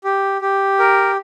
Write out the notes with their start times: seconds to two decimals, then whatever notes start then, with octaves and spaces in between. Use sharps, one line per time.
0.04 G4
0.41 G4
0.79 A#4